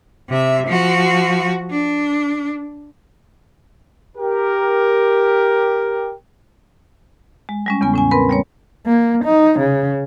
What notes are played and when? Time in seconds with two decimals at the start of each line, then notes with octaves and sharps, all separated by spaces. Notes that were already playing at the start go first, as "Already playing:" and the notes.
0.30 C3 E5
0.67 F3 F#4
1.70 D4
4.18 G4 A#4
7.49 G#3
7.66 G3 G#3 C#4
7.81 E2 C#3 B3 G#5
7.94 A2 C#4 G#5
8.11 C4 A#4 B4 B5
8.29 G3 A#3 C#5
8.86 A#3
9.25 D#4
9.60 C#3